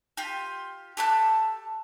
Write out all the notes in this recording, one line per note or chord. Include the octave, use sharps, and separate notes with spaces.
F4 G4
G4 A4 A5 F#6